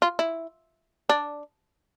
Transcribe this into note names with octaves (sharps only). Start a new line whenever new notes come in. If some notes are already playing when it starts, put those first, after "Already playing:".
F4
E4
D4